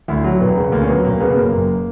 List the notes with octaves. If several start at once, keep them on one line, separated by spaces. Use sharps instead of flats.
D2 E4
F#3
E1 B3
C#3
D2 A#3
C#4
F#3 B3
E1 A#3
C#3 B3
B3
F#2 A#3
F#1